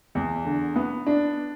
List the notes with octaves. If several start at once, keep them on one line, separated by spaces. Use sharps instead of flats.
E2
D3
B3
D4